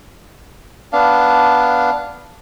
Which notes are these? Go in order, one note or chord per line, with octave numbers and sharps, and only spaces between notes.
B3 D4 F5